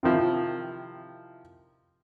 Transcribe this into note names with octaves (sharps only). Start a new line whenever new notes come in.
C3 D#3 F3 E4